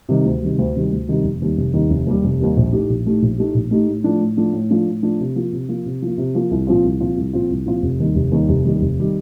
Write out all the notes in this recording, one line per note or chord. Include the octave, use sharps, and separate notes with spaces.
C3 D#3 G3
D2
C3 D#3 G3
D2
C3 D#3 G3
D2
C3 D#3 G3
F1
D#2 D#3 G3
F1
D#2 D#3 G3
F1
D#2 D#3 G3
F1
D#2 D#3 G3
A#1
A2 A3 D#4 G4
A#1
A2 A3 D#4 G4
A#1
A2 A3 D#4 G4
A#1
A2 A3 D#4 G4
A2
F3 A3 D4
A2
F3 A3 D4
A2
F3 A3 D4
A2
F3 A3 D4
C3
F3 A#3
C3
F3 A#3
C3
F3 A#3
C3
F3 A#3
C2
A#2 F3 C4 F4
C2
A#2 F3 C4 F4
C2
A#2 F3 C4 F4
C2
A#2 F3 C4 F4
F1
D#2 D#3 G3
F1
D#2 D#3 G3
F1
D#2 D#3 G3
F1
D#3 G3